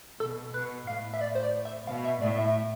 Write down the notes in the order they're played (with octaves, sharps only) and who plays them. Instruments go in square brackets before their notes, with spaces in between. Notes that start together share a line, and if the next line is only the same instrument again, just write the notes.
[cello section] B2 [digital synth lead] A4
[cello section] B2 [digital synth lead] B4
[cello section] A2 [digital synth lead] F5
[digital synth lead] E5
D5
C5
D5
E5
[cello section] B2 [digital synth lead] F5
[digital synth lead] E5
[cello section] A2 [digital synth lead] D5
[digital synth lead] E5